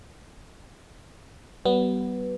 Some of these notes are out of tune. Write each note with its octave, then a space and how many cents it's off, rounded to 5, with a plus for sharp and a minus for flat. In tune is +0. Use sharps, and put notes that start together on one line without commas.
G3 -40 B3 +0